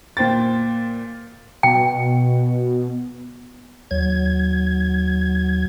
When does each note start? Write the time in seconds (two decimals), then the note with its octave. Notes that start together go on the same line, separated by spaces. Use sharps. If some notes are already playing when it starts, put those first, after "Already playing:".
0.17 A#2 C5 G5 A6
1.63 B2 G5
3.91 D#2 F#3 G#6